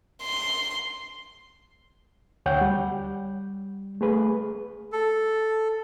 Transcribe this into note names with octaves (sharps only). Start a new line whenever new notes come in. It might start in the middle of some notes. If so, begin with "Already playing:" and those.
C6
D2 C#5 F#5 G5 G6
G3
A3 G#4 B4
A4